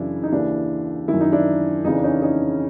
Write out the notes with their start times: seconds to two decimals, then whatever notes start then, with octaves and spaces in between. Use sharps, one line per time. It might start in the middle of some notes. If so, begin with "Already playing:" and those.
Already playing: F#2 C#3 E3 D4 E4
0.23 D#4
0.32 D#2 C#3 E3 D4 E4
1.08 F#2 D#3 E4
1.20 D#4
1.32 D4 E4
1.84 F2 C#3 E3 D#4
1.94 D4
2.04 C#4 D#4
2.22 C#4 D#4